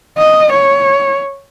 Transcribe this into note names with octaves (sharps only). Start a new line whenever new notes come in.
D#5
C#5